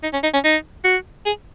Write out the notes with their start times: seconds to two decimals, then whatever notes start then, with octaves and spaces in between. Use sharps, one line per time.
0.03 D#4
0.13 C#4
0.23 D#4
0.33 C#4
0.44 D#4
0.84 F#4
1.26 G#4